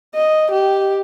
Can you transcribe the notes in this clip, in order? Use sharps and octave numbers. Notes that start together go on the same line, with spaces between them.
D#5
G4